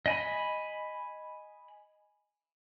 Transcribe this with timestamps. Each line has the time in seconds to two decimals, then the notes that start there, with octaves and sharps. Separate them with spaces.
0.06 D#5 G#5 B5